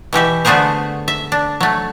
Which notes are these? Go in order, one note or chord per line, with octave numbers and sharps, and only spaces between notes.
B2 E3 G4 E5
D3 A3 B3 F#4 G#4 C5
E5
D4
F#3 A3